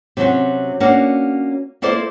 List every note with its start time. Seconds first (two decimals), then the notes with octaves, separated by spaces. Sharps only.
0.17 C3 F#3 C#4 F#4
0.80 A#3 C#4 D4 F#4 F5
1.82 A#3 E4 A4 C5 D5